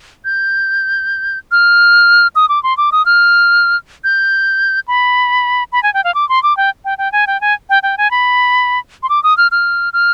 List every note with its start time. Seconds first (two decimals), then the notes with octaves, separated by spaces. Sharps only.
0.25 G6
1.52 F6
2.36 D#6
2.49 D6
2.63 C6
2.77 D6
2.92 D#6
3.06 F6
4.04 G6
4.88 B5
5.72 B5
5.83 G#5
5.94 G5
6.04 F5
6.15 D6
6.29 C6
6.43 D6
6.57 G5
6.85 G5
6.98 G5
7.12 G#5
7.27 G5
7.41 G#5
7.70 G5
7.83 G5
7.98 G#5
8.11 B5
9.03 C6
9.09 D6
9.23 D#6
9.37 F6
9.51 F6
9.93 F6